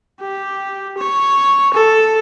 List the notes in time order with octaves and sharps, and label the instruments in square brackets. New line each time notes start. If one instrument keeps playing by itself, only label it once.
[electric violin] G4
C#5
A4